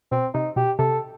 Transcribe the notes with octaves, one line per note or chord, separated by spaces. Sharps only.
B2 C4
C3 D#4
B2 G4
C3 A4